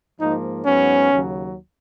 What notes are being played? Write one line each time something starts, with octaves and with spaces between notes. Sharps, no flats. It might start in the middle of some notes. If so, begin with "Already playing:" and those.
G#2 F3 A#3 D#4
G#2 F#3 B3 C#4
D#2 C#3 F#3